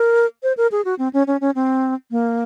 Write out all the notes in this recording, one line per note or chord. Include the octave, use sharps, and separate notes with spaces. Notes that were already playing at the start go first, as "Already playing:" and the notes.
Already playing: A#4
C5
A#4
G#4
F#4
C4
C#4
C#4
C#4
C4
A#3